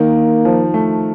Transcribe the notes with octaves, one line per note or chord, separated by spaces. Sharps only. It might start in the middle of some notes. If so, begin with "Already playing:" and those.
Already playing: D#3 A#3
F3
A3